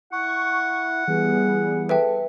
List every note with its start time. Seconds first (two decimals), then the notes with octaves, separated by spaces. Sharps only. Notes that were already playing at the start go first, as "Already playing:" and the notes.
0.13 E4 F#5 C#6
1.08 E3 G3 B3 G#4
1.89 A4 B4 E5 G5